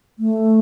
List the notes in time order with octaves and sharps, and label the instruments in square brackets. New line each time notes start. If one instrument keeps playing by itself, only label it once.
[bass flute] A3